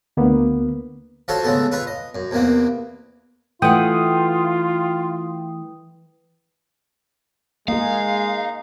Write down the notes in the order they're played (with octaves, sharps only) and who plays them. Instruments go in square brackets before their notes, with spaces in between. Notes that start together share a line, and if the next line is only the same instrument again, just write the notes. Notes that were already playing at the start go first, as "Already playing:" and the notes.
[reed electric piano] D2 A#3 B3
[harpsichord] F3 F4 F#4 A4 C#5
C#3 G#3 A3 B3 A4
F4 B4 C#5 A#5
D#5
F#2
E2 C3 A#3 B3
[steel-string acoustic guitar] E3 [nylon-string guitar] A3 F#5 [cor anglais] F4 [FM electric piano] G5 D#6
[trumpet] G#3 [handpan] A#3 G#4 [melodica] D#4 [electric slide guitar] F5